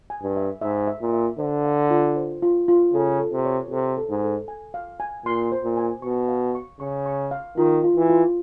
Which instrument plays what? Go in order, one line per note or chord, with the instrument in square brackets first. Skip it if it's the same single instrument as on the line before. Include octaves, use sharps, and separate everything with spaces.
[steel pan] G#5
[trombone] G2
[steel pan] E5
[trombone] G#2 [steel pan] E5
[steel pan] E5
[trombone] A#2
[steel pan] E5
[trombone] D3 [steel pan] C5
[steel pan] F5
F4
C5
F4
F4
[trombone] C#3 [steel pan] A4
[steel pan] A4
[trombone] C3
[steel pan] C#5
[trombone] C3 [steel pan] A4
[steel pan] A4
[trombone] G#2
[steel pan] A4
G#5
F5
G#5
[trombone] A#2 [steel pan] C6
[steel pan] C5
[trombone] A#2
[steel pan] G#5
[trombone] B2 [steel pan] C#6
[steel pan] F5
C#6
[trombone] C#3 [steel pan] C#6
[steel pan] C#6
F5
[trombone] D#3 [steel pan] F4
[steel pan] F4
[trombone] E3
[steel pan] F4